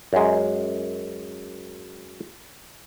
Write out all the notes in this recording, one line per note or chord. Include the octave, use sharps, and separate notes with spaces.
F#2 G#3